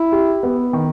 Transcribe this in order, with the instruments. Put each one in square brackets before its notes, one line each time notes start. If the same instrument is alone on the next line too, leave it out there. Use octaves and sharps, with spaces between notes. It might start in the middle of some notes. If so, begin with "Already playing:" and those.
Already playing: [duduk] E4
[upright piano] G4
B3
D#3